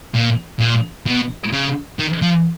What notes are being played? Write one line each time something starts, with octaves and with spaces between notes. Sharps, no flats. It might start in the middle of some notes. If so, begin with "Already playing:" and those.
A#2
A#2
B2
C#3
D#3
F3